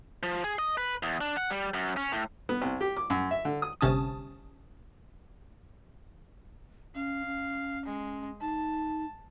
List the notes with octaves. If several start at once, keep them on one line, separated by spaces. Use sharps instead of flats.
F3
G#4
D#5
B4
E2
D4
F#5
G3
F#2
C#4
A2
B3
C2
G4
D6
F#2
E5
D3
D#6
G1 C3 C#4 A5 D#6
C#4 F5
C#4
G#3
D#4 A5